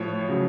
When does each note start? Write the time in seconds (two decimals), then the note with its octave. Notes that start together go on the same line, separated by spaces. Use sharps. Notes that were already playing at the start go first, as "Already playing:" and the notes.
Already playing: A2 F3 C#5
0.29 C#3 F#3